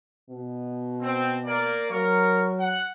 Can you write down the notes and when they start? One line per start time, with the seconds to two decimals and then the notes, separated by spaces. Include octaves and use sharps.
0.30 B2
1.01 C4
1.46 A#3 D5
1.91 F#3 A#4 C#6
2.59 F#5